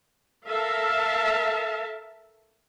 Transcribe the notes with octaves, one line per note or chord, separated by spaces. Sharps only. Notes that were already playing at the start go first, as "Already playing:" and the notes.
A4 A#4 E5 F5 A5